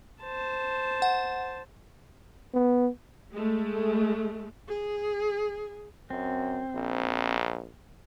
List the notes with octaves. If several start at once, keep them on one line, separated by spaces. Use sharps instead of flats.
C5 A5
F#5
B3
G#3 A3
G#4
F#2 C4
A#1